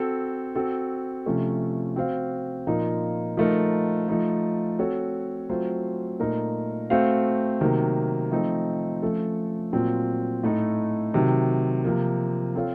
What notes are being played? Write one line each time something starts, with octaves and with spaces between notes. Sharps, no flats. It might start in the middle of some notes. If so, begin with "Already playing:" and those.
Already playing: C4 F#4 A4
C4 F#4 A4
C3 F3 A3 C#4 A4
C4 F#4 C5 F5
A#2 F3 A#3 D#4
F3 A3 D#4 A#4
F3 A3 D#4
C4 F#4 A4 C#5
F#3 A3 C4 F4 C5
A#2 A3 D#4 A#4
A3 C4 F#4 C5 F5
C3 D#3 F#3 A#3
F3 A3 C4 D#4
F3 A3 C#4 A4
A#2 F#3 C4 F4
A2 A3 D#4
C3 D#3 F#3
C3 F3 A#3
C4 F4 A4 C#5 F5